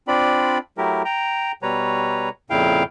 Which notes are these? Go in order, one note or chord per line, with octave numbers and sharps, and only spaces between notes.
C4 D4 F4 D5 B5
F#3 A3 E4 G4 A#4
G5 A#5
B2 G3 B4 C#5 A#5
F2 A#2 C#3 E4 F5 G5